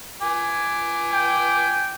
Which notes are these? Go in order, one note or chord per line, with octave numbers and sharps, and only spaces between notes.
G#5 D6
G5